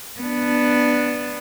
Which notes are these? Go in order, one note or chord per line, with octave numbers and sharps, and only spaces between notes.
B3 D4